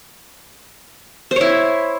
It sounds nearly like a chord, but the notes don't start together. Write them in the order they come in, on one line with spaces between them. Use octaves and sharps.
C5 C#5 E4